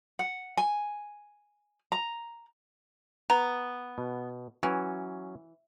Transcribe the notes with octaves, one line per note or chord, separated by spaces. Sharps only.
F#5
G#5
A#5
B3 A#5
B2
E3 F#3 C#4